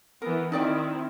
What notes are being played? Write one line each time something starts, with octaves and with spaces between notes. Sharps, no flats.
E3 B3 A#4
D#3 C4 D#4 E4 D5 G5